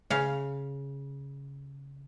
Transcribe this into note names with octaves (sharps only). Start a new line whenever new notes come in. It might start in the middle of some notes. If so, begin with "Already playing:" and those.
C#3 F5